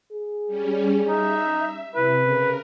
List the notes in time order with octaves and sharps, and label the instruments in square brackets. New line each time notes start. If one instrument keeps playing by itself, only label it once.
[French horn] G#4
[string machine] G3 C#4
[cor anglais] D#4 [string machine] E5
[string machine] C3 [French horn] E4 [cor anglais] B4
[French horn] C#3 [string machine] A#4